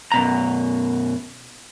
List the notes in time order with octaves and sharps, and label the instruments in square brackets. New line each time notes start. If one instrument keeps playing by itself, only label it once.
[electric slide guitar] F#2 B2 A#5